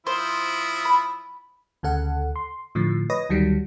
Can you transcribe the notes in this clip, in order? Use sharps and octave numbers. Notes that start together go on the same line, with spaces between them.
F3 E4 C5 D#6
B5
D2 C#3 A4 F#5
C6
A2 D3 F3
B4 C#5 D#5 D#6 A#6
D2 D#3 F#3 G3